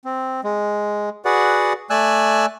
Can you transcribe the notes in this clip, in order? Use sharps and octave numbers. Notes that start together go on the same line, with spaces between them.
C4
G#3
F#4 G#4 B4 D5 F#5
A3 D5 G#5 E6 F#6